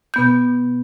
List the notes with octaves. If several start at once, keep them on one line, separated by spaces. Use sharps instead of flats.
B2 B3 G6